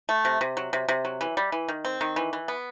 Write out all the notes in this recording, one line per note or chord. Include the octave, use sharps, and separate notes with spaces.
A3
C3
C3
F#3
C3
C3
F#3
E3
G3
E3
D#3
C4
D#3
E3
E3
B3